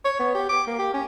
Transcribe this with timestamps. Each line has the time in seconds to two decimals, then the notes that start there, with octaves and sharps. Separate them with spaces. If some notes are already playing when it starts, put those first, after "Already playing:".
0.05 C#5
0.19 B3
0.34 G4
0.49 D6
0.67 A#3
0.79 G4
0.94 C#4